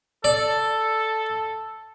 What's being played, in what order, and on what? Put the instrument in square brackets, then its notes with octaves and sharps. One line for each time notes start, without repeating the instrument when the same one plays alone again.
[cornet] A4 [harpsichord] D5